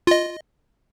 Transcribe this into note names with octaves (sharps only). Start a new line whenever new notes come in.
F4 D#5